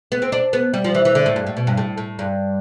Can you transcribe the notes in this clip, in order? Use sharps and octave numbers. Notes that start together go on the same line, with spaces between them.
B3
C4
D4
B3
G3
F3
E3
E3
D3
A2
G2
A2
B2
G2
A2
A2
G2